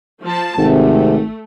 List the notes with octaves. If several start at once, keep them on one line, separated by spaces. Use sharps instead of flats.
F3 A5
G#1 C3 A3